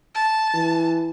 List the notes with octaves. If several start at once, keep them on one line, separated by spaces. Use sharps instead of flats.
A5
E3